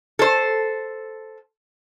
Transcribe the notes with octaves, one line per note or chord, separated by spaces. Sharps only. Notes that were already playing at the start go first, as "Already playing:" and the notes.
A4 C5